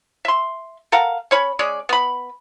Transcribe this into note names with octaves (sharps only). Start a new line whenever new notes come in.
E5 C6
A4 A#4 F5 F#5
C#4 C#5 B5
G#3 C#4 G#4 D5
B3 B5